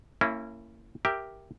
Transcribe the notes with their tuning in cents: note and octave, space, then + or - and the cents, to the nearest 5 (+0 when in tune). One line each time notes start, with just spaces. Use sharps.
A#3 -30 C#4 -10 E4 +0
G4 +0 A#4 +0 E5 +0